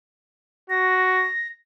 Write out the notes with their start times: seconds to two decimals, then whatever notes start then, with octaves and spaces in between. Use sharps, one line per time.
0.70 F#4 A#6